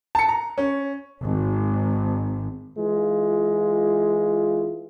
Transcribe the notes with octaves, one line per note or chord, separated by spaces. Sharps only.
A5 C#7
A#5
C#4
G#1
E3 G#3 F4